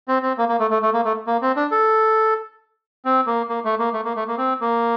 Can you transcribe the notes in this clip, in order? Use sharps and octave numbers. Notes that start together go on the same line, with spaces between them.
C4
C4
A#3
A#3
A3
A3
A3
A#3
A3
A#3
C4
D4
A4
C4
A#3
A#3
A3
A#3
A3
A#3
A3
A#3
C4
A#3